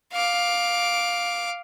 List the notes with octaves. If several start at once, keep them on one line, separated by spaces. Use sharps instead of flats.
F5 D6